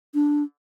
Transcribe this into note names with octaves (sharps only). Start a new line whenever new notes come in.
D4